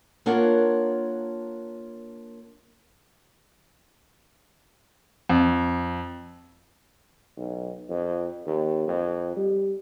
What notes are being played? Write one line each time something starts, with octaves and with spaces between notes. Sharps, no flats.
A#3 D4 F4 A#4 C#5 F#5
F2
B1
F2
D#2
F2
G3